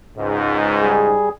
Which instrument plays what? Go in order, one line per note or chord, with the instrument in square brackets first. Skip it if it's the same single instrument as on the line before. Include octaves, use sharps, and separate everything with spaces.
[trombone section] C#2 G#2
[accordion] G3 G#4